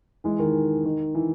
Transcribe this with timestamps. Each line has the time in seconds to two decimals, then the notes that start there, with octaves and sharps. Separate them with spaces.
0.24 E3 G#3
0.39 D#3
0.85 D#3
1.15 E3